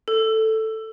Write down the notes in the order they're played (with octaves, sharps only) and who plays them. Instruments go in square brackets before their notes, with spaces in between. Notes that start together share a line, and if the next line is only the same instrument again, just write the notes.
[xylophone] A4